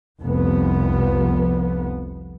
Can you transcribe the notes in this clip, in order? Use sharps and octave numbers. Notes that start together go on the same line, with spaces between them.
F1 C2 F3 B3